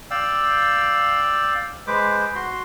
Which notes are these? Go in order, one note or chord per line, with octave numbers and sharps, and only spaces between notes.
D5 F5 G5 E6
G#3 B4 C5 D6
F#4 C6